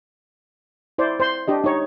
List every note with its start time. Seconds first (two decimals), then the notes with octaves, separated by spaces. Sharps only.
0.98 E4 C5 D5
1.20 C5 C6
1.48 D4 G4 D#5
1.64 D#4 C#5